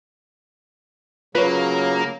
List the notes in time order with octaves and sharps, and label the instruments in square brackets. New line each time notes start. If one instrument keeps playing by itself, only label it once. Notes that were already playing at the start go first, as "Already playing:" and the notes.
[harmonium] C#3 F#3 [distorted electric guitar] A#3 [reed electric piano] F4 C#5 [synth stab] B4